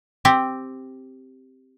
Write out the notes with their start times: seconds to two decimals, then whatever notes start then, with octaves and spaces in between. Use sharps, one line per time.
0.25 C4 G4